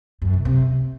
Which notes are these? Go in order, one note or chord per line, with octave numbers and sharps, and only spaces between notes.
F#2
C3
C3